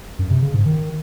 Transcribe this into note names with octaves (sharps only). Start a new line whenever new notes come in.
F#2
C3
C#3
G#2
D#3